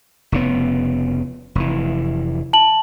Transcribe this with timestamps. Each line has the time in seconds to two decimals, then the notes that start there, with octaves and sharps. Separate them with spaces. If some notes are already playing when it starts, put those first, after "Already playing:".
0.32 F1 C#3 B3
1.55 F1 E3
2.53 A5 F#7